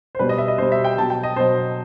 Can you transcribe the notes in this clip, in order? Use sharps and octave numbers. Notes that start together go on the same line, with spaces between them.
C5
B2 G3 B4
D#5
E5
D#5
B2 G3 C5
E5
G5
B2 F#3 A5
G5
D#5
B2 F#3 C5